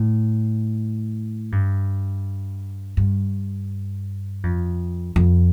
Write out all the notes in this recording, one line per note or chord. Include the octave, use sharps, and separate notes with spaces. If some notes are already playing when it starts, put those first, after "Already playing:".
Already playing: A2
G2
G2
F2
F2